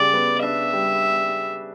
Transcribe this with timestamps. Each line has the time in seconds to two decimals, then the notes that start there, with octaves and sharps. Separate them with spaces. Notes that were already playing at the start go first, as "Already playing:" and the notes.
Already playing: C#3 G3 D5
0.14 B3
0.43 D4 E5
0.73 G3